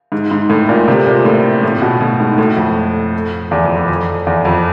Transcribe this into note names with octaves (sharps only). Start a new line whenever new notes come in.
G#2
G#2
A2
A#2
C3
A#2
A2
A2
B2
A2
G#2
A2
F2
E2
F2
F2
F2
E2
F2